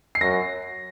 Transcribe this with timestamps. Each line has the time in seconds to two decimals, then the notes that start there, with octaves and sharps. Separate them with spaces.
0.15 C7
0.21 F#2 A#6